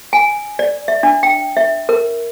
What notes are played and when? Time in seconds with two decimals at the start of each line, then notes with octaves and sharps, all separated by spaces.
0.13 G#5
0.59 D5
0.88 E5
1.03 D4
1.23 G5
1.57 E5
1.89 A#4